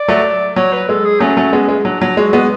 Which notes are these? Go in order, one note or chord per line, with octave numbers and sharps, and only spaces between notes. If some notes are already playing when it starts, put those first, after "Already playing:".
Already playing: D5
F#3 A3
F#3 C#5
B4
G#3 A4
G#4
F#3 A3 C#4
F#3 A3
G#3 B3
G#3
F#3 D4
F#3
G#3 F#4
G#3 B3